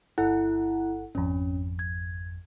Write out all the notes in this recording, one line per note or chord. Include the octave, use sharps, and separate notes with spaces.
G1 E4 A4 F#5
G#1 F2 C#4
G#6